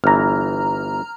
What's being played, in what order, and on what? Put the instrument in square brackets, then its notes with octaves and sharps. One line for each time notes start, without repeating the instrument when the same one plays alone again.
[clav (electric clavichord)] G1 E3 [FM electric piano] A#5 F6